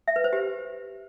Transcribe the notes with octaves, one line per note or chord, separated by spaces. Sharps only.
E5
B4
C5
G4